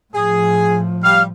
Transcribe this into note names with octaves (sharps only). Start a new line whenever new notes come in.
A2 F3 G#4
G3 F5 F6